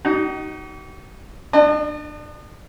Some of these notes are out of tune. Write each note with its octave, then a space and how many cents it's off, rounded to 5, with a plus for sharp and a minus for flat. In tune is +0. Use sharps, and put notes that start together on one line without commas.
D#4 +0 F#4 +45
D4 +25 D#5 -40